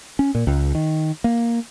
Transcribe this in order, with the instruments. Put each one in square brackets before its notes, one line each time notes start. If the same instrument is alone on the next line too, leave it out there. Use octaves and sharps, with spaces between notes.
[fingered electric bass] C#4
A#2
C#2
D#3
A#3